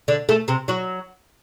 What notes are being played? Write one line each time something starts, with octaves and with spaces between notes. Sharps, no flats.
D3 D4
A3 A4
C3 C4
F#3 F#4